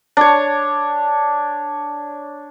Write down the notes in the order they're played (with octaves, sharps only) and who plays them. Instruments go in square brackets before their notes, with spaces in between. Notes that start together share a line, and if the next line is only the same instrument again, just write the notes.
[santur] D4 C#5